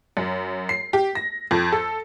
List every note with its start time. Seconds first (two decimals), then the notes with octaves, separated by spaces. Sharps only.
0.17 F#2
0.69 C7
0.93 G4
1.15 A#6
1.51 F2
1.72 A4